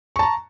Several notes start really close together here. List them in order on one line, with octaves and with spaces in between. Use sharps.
C#6 A5 A#5